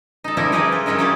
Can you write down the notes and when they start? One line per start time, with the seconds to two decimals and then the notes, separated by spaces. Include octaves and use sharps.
0.24 D#4 A4
0.37 F3 G3 C#4 D#4 E4 A#4
0.52 D#4 E4 G4 G#4 A#4 B4
0.72 F4
0.86 D#3 F#3 C#4 D#4 E4
0.98 C#4 E4 F4 G4 G#4 D5